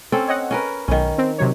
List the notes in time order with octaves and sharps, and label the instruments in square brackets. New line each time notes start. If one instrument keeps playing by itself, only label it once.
[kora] C4 C#4 A4
[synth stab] C#5 D#5 F#5
[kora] C#4 A#4 B4
[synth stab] B1 [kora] D#3 C#4
[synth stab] C4
C3 F#3 C#5